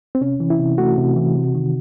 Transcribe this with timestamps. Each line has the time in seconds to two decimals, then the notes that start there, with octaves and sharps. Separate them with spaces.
0.15 C4
0.21 C3 C#4
0.40 E3
0.50 E4
0.60 C3
0.78 A3 F#4
0.98 C3
1.17 E3
1.35 C3
1.55 D#3